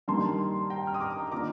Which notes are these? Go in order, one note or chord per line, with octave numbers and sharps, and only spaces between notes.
G2 D#3 G3 A#3 D#4 A5 C6
G5 A#5
F6
D#6
A#5 D6
D#3 A#3 D4 F4 A#5 D6